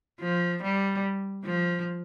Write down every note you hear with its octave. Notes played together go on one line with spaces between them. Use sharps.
F3
G3
F3